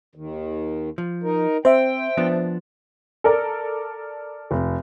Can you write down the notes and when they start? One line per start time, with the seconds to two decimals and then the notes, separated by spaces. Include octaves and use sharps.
0.15 D#2 D#3
0.98 F3
1.23 D#4 A#4
1.65 C4 C5 E5 G5
2.17 F3 B3 D4
3.24 A4 A#4 D5
4.51 F1